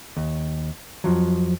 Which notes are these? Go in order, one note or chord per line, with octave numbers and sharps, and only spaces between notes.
D#2
F2 F3 F#3